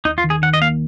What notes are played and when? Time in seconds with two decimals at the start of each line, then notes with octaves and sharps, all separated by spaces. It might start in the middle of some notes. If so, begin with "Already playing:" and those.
0.05 D#2 D#4
0.18 F4
0.24 D#3
0.30 G#4
0.42 D#3 F#5
0.54 D#5
0.62 A#3 F5